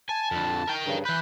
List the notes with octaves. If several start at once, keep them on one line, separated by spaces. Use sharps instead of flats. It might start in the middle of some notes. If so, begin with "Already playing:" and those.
G#5 A5
F2 D3
A#4 G5
G2 C#3
E3 B4 F#6 G6